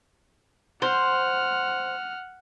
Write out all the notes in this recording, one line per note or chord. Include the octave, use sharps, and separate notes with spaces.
C5 F#5 F6